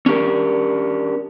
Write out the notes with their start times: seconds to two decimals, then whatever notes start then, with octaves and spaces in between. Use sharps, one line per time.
0.06 C#4 D4 G4 A#4